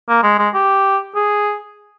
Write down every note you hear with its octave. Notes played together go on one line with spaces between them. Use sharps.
A#3
G#3
G#3
G4
G#4